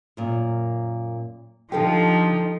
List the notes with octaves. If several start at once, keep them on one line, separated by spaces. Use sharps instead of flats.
F#2 A#2
D3 F3 D#4 G4 A4 G5